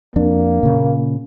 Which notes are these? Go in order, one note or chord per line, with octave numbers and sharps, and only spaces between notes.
F2 A#3 D4
A#2 C#3